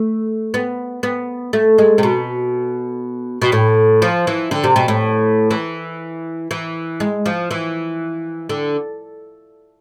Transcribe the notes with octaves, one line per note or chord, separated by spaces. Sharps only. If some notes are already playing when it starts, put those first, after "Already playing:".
Already playing: A3
B3
B3
A3
G#3
C3
B2
B2
A2
F3
E3
D3
C3
B2
A2
E3
E3
G#3
F3
E3
D3